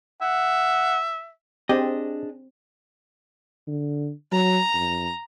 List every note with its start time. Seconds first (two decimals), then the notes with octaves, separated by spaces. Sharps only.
0.22 E5 F#5
1.69 C4 D4 G4 G#4 D#5
3.68 D3
4.32 F#3 A#5
4.74 F2